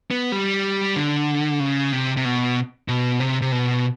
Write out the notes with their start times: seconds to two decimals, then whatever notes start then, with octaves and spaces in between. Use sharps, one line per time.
0.11 B3
0.32 G3
0.96 D3
1.60 C#3
1.92 C3
2.17 C3
2.25 B2
2.88 B2
3.20 C3
3.42 C3
3.52 B2